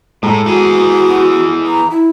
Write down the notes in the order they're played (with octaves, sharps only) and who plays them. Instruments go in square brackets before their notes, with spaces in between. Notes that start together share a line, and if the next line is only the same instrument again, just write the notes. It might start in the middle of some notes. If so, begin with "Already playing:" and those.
[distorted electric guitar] A2 [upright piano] G#3 A4 A#5
[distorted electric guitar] E3 G#4 [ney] F#4
[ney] A#5
E4